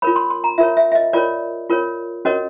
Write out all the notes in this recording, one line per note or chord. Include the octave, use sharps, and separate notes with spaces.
F4 A#4 C#5 B5
C6
C6
A#5
F4 A#4 C#5 E5
E5
E5
D#5
F4 A#4 C#5 D5
F4 A#4 C#5
C#4 F#4 A#4 C#5 D#5